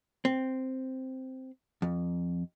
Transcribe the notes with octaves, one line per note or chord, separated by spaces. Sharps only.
C4
F2